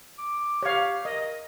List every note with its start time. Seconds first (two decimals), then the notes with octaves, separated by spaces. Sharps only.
0.19 D6
0.63 G4 C#5 F5
1.05 A#4 D#5